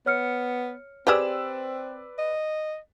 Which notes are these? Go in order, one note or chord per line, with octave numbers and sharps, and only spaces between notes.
B3 C#5 F6 C#7
C4 G4 G#4 B4 D5 E6
D#5